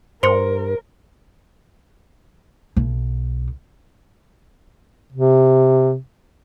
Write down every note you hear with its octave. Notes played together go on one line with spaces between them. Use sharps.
G2 A#4 C5 C6 C#7
B1
C3